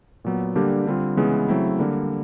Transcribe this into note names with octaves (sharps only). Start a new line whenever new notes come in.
A#2 F#3 B3
D3 G3 A#3 D4 G4
D3 G3 C4 F4
C#3 E3 G#3 B3
C#3 F#3 A3 C4 E4
D3 G3 A#3